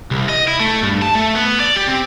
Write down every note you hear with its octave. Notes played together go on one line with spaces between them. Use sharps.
C2
D#5
E4
A3
G2
A5
A3
B3
D5
G4
C4